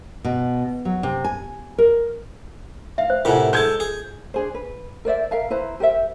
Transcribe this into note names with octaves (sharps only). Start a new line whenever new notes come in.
B2
F#3
C3
G#5
A#4
E5 F5
C5
A2 C3 F4 A#4 F#5 G#5
G#3 A4 G6 G#6
G#4
D4 G#4 C5
B4
A#4 C5 D5 E5
A#4 E5 F5 A#5
E4 B4 C5 A#5
G4 A#4 C5 E5